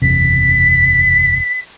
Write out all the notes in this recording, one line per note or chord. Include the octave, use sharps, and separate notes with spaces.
F#1 E2 C3 B6